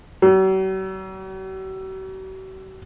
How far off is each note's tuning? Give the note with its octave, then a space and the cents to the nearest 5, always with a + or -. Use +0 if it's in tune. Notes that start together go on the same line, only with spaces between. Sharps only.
F#3 +45